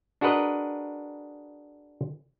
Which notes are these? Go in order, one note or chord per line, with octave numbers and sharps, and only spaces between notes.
D4 F#4 G#4 A#4 B4 D#5